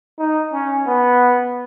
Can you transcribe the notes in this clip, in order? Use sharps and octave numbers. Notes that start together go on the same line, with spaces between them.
D#4
C#4
B3